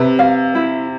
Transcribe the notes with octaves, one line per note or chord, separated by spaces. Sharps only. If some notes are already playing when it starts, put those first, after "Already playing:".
Already playing: C3 B4
F5
E4